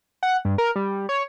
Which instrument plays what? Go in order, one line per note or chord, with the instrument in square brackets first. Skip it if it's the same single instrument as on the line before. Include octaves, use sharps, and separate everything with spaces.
[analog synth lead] F#5
G2
A#4
G3
C#5